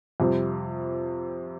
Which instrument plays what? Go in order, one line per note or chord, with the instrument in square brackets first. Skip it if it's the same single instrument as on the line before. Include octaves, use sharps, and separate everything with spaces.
[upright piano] F2 C3 G3